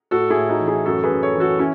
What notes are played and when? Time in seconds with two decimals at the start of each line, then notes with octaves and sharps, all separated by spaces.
0.11 A2 F#4 A4
0.30 E4 G#4
0.36 A2
0.49 D#4 F#4
0.60 E3
0.67 E4 G#4
0.85 F#2 F#4 A4
1.03 G#4 B4
1.11 F#2
1.22 A4 C#5
1.35 E3
1.40 F#4 A4
1.59 C#4 E4